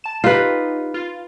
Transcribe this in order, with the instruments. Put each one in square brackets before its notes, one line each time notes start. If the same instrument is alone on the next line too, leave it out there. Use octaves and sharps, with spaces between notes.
[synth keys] A5 E7
[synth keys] D#4 G4 [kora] F4 B4
[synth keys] F4